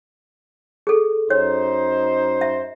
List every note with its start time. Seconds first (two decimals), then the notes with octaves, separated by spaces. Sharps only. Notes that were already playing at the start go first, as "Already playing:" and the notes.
0.87 G#4 A4
1.30 F#2 D#4 C5 C#5
2.41 E5